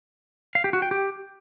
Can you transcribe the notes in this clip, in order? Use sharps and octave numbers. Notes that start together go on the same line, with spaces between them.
F5
G4
F#4
G5
G4